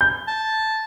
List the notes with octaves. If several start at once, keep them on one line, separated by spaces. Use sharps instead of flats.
G6
A5